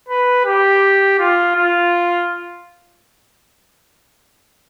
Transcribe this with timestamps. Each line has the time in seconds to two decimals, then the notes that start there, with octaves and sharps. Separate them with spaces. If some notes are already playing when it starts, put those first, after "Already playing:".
0.08 B4
0.45 G4
1.19 F4
1.56 F4